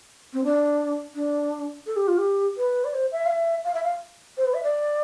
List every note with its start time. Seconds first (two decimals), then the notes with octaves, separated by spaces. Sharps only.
0.33 C4
0.44 D4
1.15 D4
1.87 A4
1.96 G4
2.08 F4
2.18 G4
2.57 B4
2.85 D5
2.94 C5
3.12 E5
3.26 F5
3.30 E5
3.65 F5
3.74 E5
3.84 F5
4.37 C5
4.45 B4
4.54 E5
4.63 D5